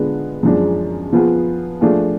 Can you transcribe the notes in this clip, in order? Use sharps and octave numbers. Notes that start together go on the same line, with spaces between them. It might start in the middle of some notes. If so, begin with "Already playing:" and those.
Already playing: D3 G#3 B3 D4 F4
F#2 F3 G#3 D4
F3 B3 F4 G#4
F3 A3 D4 F4 G#4